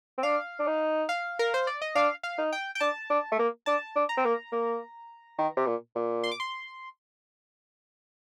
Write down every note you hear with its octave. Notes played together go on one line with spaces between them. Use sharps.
C4
D4 F5
D4
D#4
F5
A#4
C5
D5
D#5
D4 F5
F5
D#4
G5
G5
D4 A5
D4
A3
A#3
D4 A5
D4
A#5
C4
A#3
A#3
D#3
C3
A#2
A#2
C6
D6
C6